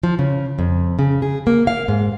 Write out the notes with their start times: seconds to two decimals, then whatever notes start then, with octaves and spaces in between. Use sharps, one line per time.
0.03 F3
0.19 C#3
0.59 F2
0.99 C#3
1.22 G#4
1.47 A#3
1.67 F5
1.88 G#2